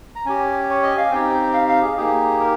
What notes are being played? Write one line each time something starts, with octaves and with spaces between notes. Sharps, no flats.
A#5
C#4 G4 G#5
C#5
D#5
F5
C4 D#4 G4 G5
F5
F5
G#4
A#3 D#4 G4 G#4
A#4